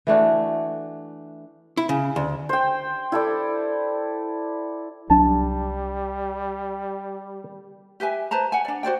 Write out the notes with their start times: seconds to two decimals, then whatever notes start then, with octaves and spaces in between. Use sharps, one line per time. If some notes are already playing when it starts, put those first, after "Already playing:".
0.07 E3 A3 D4 F#4
1.77 E4
1.89 C#3
2.16 D2
2.49 C5 G5
3.12 E4 A4 D5
5.10 C2 F#3 G3 D4 A5
8.00 G4 B4 E5 G#5
8.31 B4 C5 A5 A#5
8.52 F#5 G#5
8.65 D4 D5
8.83 F#4 C5 D5 G5